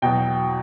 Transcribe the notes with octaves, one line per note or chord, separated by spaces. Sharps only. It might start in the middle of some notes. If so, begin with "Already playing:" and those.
E2 B2 F#3 G5